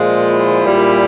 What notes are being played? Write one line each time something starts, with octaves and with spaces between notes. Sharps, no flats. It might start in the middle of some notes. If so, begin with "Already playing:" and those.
Already playing: A#2 F3 G#3
E4
A#2 G3 A#3